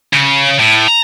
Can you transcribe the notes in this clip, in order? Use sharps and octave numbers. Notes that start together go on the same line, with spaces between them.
C#3
A2
A#5